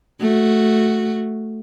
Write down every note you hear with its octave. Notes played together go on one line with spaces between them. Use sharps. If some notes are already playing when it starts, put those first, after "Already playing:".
A3 F#4